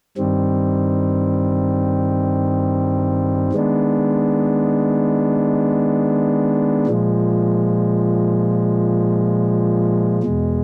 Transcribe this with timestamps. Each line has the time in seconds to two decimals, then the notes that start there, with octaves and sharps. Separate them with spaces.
0.17 G2 D#3 G3 C4
3.52 D#3 G#3 B3 D4
6.87 A#2 F3 G#3
10.23 E2 B2 G#3